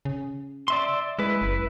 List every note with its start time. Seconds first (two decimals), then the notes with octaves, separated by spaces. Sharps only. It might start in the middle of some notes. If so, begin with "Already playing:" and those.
0.05 C#3
0.68 D5 E5 C6
1.19 G#3 E4 B4
1.42 F#1